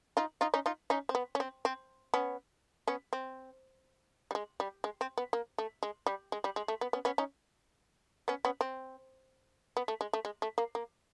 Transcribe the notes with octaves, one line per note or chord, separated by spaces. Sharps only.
D#4 F4
D#4 F4
C#4 D#4
D#4 F4
C#4 D#4
C4
B3
C#4
C4
C4
B3 C#4
B3 C#4
C4
G3
G#3
G3
G#3
C4
B3
A#3
A3
G#3
G3
G#3
G3
G#3
A3
B3
B3 C#4
B3 C#4
C#4 D#4
B3 C#4
B3 C#4
C4
B3
A3
G#3
A3
G#3
A3
A#3
A#3